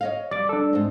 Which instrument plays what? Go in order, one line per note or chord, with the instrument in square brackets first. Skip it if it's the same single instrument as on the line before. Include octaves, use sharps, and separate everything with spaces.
[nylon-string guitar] C#5 D#5 F5
[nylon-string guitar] G3 [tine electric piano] D5 D6
[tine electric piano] D4 A4
[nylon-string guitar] G#2 C4